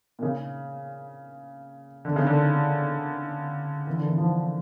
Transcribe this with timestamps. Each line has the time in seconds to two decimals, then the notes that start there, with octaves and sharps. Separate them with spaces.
0.19 A#2
0.22 C#3
2.05 D3
2.16 C#3
2.27 D3
3.87 E3
3.96 D3
4.06 E3
4.18 F3